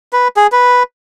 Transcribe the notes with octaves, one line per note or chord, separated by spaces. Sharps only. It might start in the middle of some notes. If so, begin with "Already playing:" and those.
B4
G#4
B4